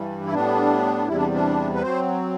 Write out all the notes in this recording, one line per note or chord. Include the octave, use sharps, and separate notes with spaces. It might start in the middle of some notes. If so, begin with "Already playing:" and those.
Already playing: G2 E3 G3
E4
A2 G3 B3 D4
E2 C3 G3 E4
D4
D4
B4
F#3 C4 C5